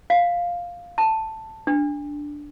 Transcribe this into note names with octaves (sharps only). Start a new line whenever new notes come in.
F5
A5
D4